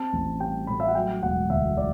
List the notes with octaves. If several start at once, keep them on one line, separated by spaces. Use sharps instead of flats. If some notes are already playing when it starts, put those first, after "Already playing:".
Already playing: C4 A5
A1
G3 G5
A2 B5
E5
F#5
F#3 G5
E1 F#5
D2 E5
F#3 D5